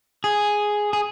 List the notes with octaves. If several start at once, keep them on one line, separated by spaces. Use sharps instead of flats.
G#4
G#4